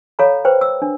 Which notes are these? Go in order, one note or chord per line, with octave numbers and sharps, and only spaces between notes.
A4 C#5 F5 A#5 B5
B4 C5 G5
E6
D4